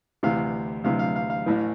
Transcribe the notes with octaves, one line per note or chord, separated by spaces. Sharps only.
D2 C3 E3 F5
D2 C3 E3 F5
F5
F5
F5
A1 A2 E3